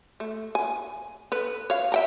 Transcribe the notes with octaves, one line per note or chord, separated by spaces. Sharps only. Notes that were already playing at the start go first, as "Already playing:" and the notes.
A3
G#5
A4 B4
C#5 F5
E5 G5 A#5